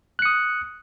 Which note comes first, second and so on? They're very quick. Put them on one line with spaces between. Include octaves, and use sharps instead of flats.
F#6 C#7 D#6